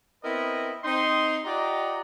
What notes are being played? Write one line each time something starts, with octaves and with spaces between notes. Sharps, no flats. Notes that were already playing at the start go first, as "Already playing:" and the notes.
B3 C4 E4 A#4 B4 D#5
C4 D#4 C6
F4 G4 D5 D#5 F#5 A#5